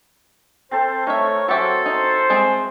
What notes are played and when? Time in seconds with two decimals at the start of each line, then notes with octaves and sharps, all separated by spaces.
0.71 C4 A4 C5
1.07 A3 D#4 A#4 C#5 E5
1.48 F#3 F#4 G4 A4 C5 C#5 E5 G#5
1.86 D#4 C5
2.30 G#3 C4 G#4